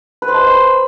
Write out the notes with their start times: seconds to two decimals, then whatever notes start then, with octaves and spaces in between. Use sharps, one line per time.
0.22 B4
0.28 C5
0.34 A5
0.40 C6
0.47 B5